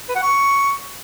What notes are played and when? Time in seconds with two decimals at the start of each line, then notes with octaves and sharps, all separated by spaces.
0.09 B4
0.16 F#5
0.22 C#6